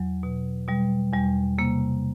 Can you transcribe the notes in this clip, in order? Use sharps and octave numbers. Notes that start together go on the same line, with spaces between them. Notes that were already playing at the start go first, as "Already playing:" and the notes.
Already playing: E2 F#3
B2
B2 G3
E2 G3
C3 A#3